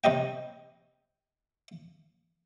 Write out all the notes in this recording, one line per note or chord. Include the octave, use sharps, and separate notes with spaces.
C3 G3 D#5 G5